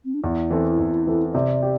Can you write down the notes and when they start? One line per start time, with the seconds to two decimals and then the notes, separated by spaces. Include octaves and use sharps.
0.05 C4
0.14 D4
0.23 E2 E4
0.51 E3 C4 A4
0.79 E2
1.07 E3 C4 A4
1.34 C3 D5
1.62 G4